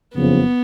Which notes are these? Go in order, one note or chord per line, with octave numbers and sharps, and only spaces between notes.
F#1 F2 C#3 F3 B3